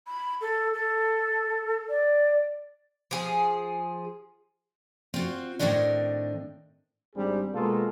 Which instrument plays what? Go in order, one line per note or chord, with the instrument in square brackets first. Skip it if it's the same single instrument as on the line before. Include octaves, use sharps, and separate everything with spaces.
[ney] B5
A4
A4
D5
[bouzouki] F3 G#4
[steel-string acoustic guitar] C4 F4 F#4
A2 D#3 G3 C4 D4 D#5
[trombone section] G#1 G3 C4 D4 G#4
B2 G#3 A#3 F4 A4